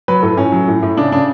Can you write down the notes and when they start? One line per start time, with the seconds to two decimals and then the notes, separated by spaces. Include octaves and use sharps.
0.08 F#3 B4
0.22 A2 A4
0.37 A2 C#4
0.52 F#3
0.68 A2
0.83 A2
0.97 C#3 D4
1.12 C#3 D4